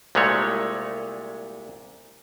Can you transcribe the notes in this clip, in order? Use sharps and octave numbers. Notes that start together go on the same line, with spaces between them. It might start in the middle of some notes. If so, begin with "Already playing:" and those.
C2 A#2 G#3 A3 C#5